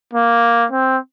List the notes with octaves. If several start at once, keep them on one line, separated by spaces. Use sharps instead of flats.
A#3
C4